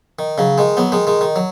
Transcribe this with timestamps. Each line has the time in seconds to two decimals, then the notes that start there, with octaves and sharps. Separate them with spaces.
0.19 D#3
0.38 C#3 F#3
0.58 D#3 G#3
0.77 F#3 B3
0.92 D#3 G#3
1.07 D#3 G#3
1.21 D#3
1.36 F#3